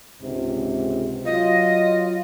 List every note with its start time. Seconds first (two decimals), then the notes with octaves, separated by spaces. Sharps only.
0.22 C#2 G#2 C3
1.25 F#3 F4 D#5